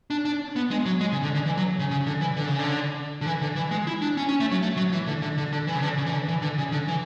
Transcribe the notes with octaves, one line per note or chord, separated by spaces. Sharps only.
D4
D4
B3
G#3
F#3
G#3
C#3
D3
D3
E3
F#3
C#3
C#3
D3
E3
D3
C#3
D3
D3
E3
D3
E3
G#3
E4
D4
C#4
C#4
A3
F#3
A3
F#3
E3
D3
D3
D3
D3
E3
C#3
D3
C#3
E3
D3
E3
D3
C#3
D3
E3